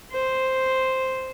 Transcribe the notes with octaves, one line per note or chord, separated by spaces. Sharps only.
C5